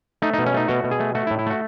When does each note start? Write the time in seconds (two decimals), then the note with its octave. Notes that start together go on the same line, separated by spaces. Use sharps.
0.22 A3 D#4
0.34 D#4
0.39 B2
0.46 C#4
0.54 A3 D#4
0.68 B2 F#4
0.84 B2
0.91 G#4
1.00 A3
1.15 A3 F#4
1.27 E4
1.31 A2
1.39 E4
1.46 A3 F#4